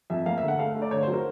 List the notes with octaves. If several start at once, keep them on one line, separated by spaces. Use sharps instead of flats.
F2 E5
A#3 F5
D3 E5
F#5
A3 F5
A3
D5
D3 C#5
F#3 C5
A#4